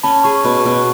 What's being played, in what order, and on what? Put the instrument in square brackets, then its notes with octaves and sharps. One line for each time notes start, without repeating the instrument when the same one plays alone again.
[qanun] C#4 [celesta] A5 B5
[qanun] G#4 [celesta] B5 C#6
[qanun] B2 [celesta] B5 C#6
[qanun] B2 [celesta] B5 C#6